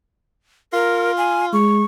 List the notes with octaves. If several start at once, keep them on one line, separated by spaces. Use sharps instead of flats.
F4 A#4
G#5
G#3 C#6